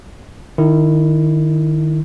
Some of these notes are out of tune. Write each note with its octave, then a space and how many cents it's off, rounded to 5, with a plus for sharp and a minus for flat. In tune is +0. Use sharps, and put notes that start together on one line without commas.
D#3 -20 E4 +0